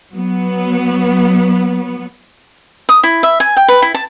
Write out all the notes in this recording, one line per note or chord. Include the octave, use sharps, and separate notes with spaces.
F#3 B3
D#6
E4
E5
G#5
G5
B4
E4
A5